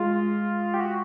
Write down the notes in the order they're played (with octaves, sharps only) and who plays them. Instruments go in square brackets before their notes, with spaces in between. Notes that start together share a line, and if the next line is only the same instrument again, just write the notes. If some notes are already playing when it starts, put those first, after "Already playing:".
Already playing: [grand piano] G#3 [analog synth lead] F4
[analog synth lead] G4
F#4